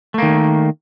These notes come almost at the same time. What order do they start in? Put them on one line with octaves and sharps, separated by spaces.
A3 A#3 D#3